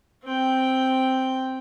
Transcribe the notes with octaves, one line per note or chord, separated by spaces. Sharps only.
C4 G5